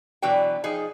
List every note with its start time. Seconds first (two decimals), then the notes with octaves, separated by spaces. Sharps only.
0.22 B2 E3 F#3 D4 B4 G5
0.64 F3 D#4 G#4